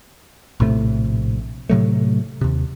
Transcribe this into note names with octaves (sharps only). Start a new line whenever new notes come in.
A#1 A2 C3 A3
A2 C3 F#3 A3
D#2 C3